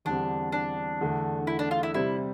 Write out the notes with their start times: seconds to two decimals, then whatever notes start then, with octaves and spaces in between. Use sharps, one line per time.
0.05 E2 D3 G3 C4 D4
0.52 D4
1.00 E2 D3 A3
1.47 E4
1.59 D4
1.71 F4
1.83 E4
1.94 C3 G3 C4 E4